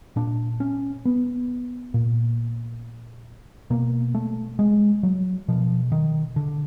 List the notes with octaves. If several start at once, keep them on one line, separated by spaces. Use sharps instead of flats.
A#2 D4
C#4
B3
A#2
B2 A#3
A3
G#3
F#3
B2 F3
D#3
D3